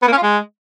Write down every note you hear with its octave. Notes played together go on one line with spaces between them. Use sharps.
B3
A#3
C#4
F4
G#3